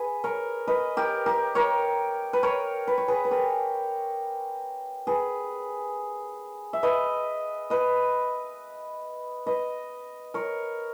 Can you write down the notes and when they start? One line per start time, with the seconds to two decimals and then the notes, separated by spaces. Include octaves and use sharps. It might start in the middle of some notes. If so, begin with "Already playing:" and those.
Already playing: G#4 B4
0.24 A#4 C#5
0.67 B4 D#5
0.97 G4 A#4
1.26 G4 A#4
1.55 A#4 C#5
2.33 B4
2.43 A#4 C#5
2.87 B4
2.98 C#5
3.08 G#4 B4
3.25 B4
3.31 G4 A#4
5.07 G#4 B4
6.73 E5
6.83 B4 D#5
7.70 B4 D#5
9.46 B4 D#5
10.34 A#4 C#5